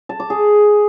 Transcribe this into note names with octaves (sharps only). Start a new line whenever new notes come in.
A5
D6
G#4